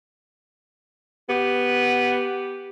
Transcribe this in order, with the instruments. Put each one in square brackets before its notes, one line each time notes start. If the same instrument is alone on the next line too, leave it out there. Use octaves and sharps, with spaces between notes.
[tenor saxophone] B3 [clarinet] G4